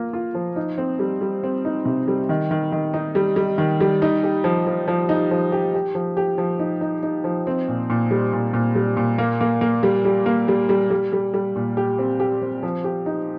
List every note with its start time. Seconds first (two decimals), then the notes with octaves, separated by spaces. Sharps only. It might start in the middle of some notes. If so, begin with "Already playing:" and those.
Already playing: A#3 F4
0.13 F4
0.35 F3
0.56 D#4
0.78 C4
0.99 G3
1.21 G3
1.43 C4
1.65 D#4
1.85 C3
2.08 G3
2.29 D#3
2.51 D#3
2.72 D#3
2.94 D#4
3.15 G3
3.36 G3
3.58 D#3
3.80 G3
4.02 D#4
4.23 G4
4.44 F3
4.67 F3
4.88 F3
5.09 D#4
5.31 F3
5.52 G4
5.74 G4
5.95 F3
6.17 G4
6.38 F3
6.59 D#4
6.81 D#4
7.03 D#4
7.24 F3
7.47 C4
7.68 A#2
7.90 A#2
8.11 G3
8.33 A#2
8.53 A#2
8.75 G3
8.97 A#2
9.18 A#3
9.41 A#3
9.61 A#3
9.83 G3
10.05 G3
10.26 A#3
10.48 G3
10.69 G3
10.90 G3
11.13 G3
11.34 G3
11.56 A#2
11.77 G4
11.98 C4
12.20 G4
12.42 C4
12.63 F3
12.84 G4
13.06 D#4